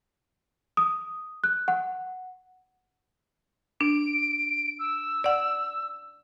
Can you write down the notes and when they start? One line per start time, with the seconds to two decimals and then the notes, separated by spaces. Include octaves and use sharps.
0.77 D#6
1.44 F#6
1.68 F#5
3.81 D4 D7
4.79 E6
5.24 D5 F#5